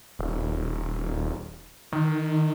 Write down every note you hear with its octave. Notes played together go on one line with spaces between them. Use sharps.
D#1
D#3